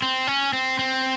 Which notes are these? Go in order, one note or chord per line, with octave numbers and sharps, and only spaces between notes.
C4
C#4
C4
C4